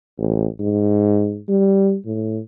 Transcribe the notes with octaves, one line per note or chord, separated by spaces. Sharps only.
A1
G#2
G3
A2